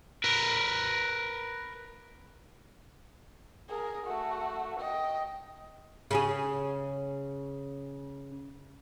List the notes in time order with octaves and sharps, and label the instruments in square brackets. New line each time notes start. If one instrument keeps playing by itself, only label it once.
[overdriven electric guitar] A#4 B4
[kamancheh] G#4 A#4
A3 F#4
D#5 G5
[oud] C#3 C#4 G#4